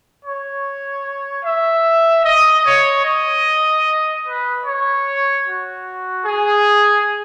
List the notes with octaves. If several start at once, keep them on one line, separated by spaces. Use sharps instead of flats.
C#5
E5
D#5
C#5
D#5
B4
C#5
F#4
G#4